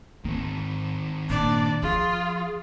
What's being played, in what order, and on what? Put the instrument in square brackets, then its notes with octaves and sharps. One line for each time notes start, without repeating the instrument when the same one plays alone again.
[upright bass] G#2 [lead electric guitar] D#3 C4
[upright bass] G2 A#2 [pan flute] D4 [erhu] D5
[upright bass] F3 [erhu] F4 [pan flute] G#4